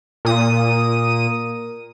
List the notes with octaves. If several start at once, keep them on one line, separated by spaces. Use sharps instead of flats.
A#2 D#6